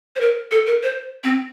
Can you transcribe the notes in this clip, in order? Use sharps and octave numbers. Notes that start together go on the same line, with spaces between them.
C5
A#4
A4
A#4
C5
C4